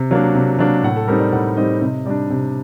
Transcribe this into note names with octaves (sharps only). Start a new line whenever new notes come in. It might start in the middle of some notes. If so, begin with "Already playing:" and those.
Already playing: C3
F#3 A#3 D4
C3
F#3 A#3 D4
A2 F#5
A4
G3 C4 D#4 A#4
D5
A2 F#5
G3 C4 D#4 D#5
C3 D#5
G3 D4 D5
C3